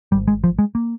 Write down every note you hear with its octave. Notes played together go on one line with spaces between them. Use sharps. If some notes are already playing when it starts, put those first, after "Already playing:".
G#1 G#2 G3
G#3
F3
G#3
A#3